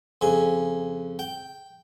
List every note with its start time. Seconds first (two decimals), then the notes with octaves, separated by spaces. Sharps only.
0.21 F2 C#3 G#5
1.19 G5